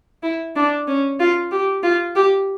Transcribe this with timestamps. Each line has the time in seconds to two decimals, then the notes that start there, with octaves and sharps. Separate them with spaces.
0.23 E4
0.56 D4
0.87 C#4
1.20 F4
1.52 G4
1.84 F4
2.16 G4